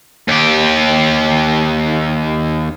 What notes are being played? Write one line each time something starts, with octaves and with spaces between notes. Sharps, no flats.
D#2 G4